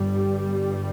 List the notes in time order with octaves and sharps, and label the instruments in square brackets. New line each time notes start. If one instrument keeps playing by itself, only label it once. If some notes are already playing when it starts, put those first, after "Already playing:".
Already playing: [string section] G1 G2 G3